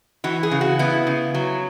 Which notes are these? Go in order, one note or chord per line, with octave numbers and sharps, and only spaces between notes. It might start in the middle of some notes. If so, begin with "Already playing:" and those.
E3 F#4
G#4
C#3
F#4
B3 E4
C#3
F#3